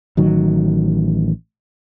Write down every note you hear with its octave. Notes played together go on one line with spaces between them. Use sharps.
A1 D#3 F#3